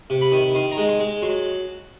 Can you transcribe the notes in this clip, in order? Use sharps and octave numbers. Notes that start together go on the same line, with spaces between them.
C3
B5
D#3
D#3 C6
A#5
G#3
C6
G#3
F#3 C6